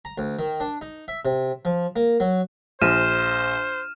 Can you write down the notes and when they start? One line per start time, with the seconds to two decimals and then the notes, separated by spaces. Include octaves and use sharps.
0.05 A#5
0.18 D2
0.39 D#3
0.60 D4
0.81 D#4
1.08 E5
1.25 C3
1.65 F3
1.96 A#3
2.20 F#3
2.82 A#1 C5 F6 D#7 E7